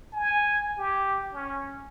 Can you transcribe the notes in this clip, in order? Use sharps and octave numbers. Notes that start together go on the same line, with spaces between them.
G#5
G4
C#4